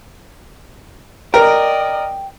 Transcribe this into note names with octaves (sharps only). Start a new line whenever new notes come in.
A#4 D5 D#5 G5